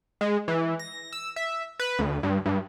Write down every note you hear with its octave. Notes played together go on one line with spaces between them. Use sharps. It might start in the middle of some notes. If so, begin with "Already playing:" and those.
G#3
E3
A#6
E6
E5
B4
D2
G2
G2